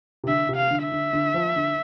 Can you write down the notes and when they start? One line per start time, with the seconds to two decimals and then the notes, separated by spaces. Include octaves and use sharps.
0.24 C3
0.27 D3 E5
0.49 C3
0.56 F5
0.71 D3
0.85 E5
0.92 D3
1.13 D3
1.34 F3
1.56 D3